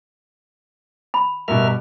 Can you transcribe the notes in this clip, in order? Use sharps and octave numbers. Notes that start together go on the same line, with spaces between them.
B5
G2 B2 A#4 E5 F6